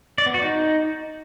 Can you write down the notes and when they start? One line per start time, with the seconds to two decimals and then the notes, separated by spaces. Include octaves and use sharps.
0.18 D5
0.26 B3
0.34 F#4
0.42 D#4